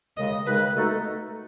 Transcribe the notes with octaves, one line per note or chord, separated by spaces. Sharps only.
D#2 C#3 G#3 D#5
D#2 C#3 G#3 B4
B2 A3 D#4 A4